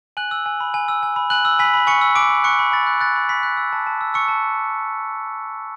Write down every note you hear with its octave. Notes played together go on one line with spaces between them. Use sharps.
G#5 F#6 F#7
E6
G#5
B5
G#5
E6
G#5
B5
G#5 F#6 F#7
E6
G#5 B5 B6
B5
G#5 C#6 C#7
E6
G#5 D6 D7
B5
C#6 F#6 C#7
B5
B5 A6
F#6
F#6 A6
B5
B5 B6
F#6
E6
A5
A5
E6
C#6 E6 C#7
A5